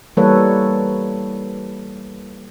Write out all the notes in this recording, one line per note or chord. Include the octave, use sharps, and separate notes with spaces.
E3 G3 A#3 A4 B4 C#5